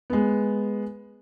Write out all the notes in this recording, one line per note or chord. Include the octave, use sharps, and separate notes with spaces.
G#3 B3